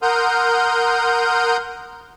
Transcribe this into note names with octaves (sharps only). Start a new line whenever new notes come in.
A#4 F#5 C6 D#6 F6 G6